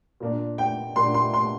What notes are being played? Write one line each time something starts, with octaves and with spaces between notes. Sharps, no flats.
A#2 A#3 D4
G5
A#2 A#3 D4 C6
C6
C6